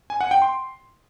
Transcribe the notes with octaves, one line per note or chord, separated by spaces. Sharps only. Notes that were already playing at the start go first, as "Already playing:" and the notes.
G#5
F#5
G5
C6